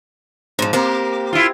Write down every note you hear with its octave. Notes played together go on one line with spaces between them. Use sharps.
G#2 F3
A#3 C4 G4 A#4
E4 F4